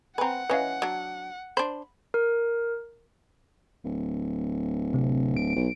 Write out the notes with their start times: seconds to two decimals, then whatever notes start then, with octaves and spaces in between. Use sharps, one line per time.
0.18 C4 B4 F#5 G#5 A#5
0.50 E3 C#4 B4 D#5 F5
0.82 F#3 D4
1.57 D4 C5 B5
2.14 A#4
3.84 D1
4.94 C3
5.37 D7
5.56 B1